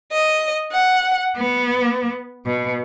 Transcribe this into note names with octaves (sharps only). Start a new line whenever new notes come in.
D#5
F#5
B3
B2